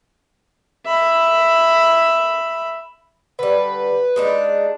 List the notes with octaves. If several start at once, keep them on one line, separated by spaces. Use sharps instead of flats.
E5 B5
D3 G3 B4
G#3 D4 D#4